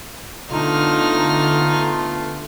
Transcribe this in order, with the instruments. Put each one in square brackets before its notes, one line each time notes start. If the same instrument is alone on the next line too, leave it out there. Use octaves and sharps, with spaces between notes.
[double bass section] D3 [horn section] A3 B3 F4 [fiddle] D#4 F6